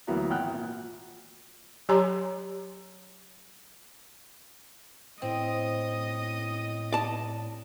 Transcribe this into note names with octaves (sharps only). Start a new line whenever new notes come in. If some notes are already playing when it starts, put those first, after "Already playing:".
D2 E3 F#3 A#3 B3 A#5
G#1 F#5 G5 F6 F#6
A#2
F#3 G4 C#5 G#5 A#5 C6
A2 C4 D#5 D#6
D5 A5